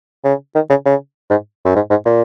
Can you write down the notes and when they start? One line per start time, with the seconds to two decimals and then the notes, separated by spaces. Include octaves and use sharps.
0.24 C#3
0.55 D#3
0.70 C#3
0.85 C#3
1.30 G#2
1.65 F#2
1.75 G#2
1.90 G#2
2.05 A#2